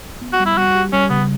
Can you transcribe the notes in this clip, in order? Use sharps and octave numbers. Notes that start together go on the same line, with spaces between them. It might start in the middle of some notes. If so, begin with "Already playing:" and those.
B3
F#4
G3
E4
G3 F#4
G4
G3 C#4
C#3 B3